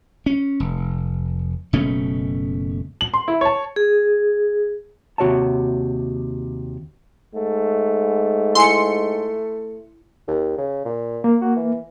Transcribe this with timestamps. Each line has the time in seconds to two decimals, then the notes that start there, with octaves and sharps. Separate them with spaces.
0.26 C#4
0.60 F1
1.73 F#1 B2 A3 C#4
3.01 F#7
3.14 C6
3.28 E4
3.41 C#5 A5
3.76 G#4
5.18 D#2 C3 F#4 C#5 E5 A5
7.35 G#2 A3
8.55 E4 G#5 C6 C#7
10.28 D#2
10.58 C#3
10.85 A#2
11.24 A#3
11.41 F#4
11.56 E3